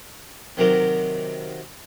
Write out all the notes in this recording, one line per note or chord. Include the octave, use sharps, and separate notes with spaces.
C3 D#3 F#3 G4 A#4